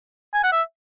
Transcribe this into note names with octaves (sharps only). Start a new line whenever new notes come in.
G#5
F#5
E5